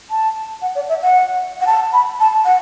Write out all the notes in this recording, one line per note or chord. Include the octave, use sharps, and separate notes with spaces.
A5
F#5
D5
E5
F#5
F#5
A5
B5
A5
F#5